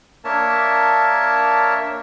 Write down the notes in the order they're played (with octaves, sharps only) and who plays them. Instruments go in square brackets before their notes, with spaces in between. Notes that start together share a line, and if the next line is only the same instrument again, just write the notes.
[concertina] A#3 D4 A#4 C#5 E5 A5